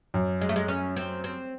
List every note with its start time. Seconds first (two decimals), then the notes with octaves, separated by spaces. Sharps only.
0.14 F#2
0.41 G#3
0.49 A3
0.56 G#3
0.68 C#4
0.96 C4
1.24 C4